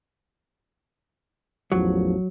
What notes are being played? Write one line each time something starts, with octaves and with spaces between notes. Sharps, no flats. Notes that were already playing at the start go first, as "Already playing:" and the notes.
A1 E2 F3 F#3